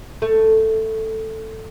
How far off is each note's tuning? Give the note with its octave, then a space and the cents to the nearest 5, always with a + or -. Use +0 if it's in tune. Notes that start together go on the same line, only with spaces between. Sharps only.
A3 +5